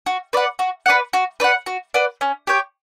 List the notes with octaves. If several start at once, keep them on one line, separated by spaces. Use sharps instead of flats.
F#4
B4 D5 F#5
F#4
B4 D5 F#5
F#4
B4 D5 F#5
F#4
B4 D5 F#5
C#4
G4 C#5 G5